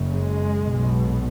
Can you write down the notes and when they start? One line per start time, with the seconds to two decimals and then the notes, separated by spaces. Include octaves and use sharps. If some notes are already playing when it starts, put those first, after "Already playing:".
Already playing: F#1 F#2 C#3
0.12 G#3
0.62 B1 B2